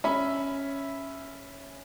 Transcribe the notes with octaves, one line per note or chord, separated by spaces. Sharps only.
C#4 E5 B5